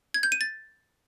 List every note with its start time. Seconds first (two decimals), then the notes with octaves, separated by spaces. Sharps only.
0.14 G#6
0.23 G6
0.32 D#7
0.41 A6